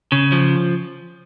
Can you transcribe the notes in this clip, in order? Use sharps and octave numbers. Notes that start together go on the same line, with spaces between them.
C#3
F3